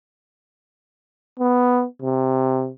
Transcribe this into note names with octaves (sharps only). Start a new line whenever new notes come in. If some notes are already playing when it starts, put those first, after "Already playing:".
B3
C3